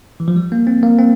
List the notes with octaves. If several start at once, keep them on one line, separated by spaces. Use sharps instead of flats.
E3
F3
G3
A#3
C4
A#3
C4